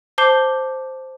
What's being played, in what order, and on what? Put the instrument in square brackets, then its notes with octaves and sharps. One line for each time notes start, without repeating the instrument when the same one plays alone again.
[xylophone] C5 A5 D6 G6 C7 G7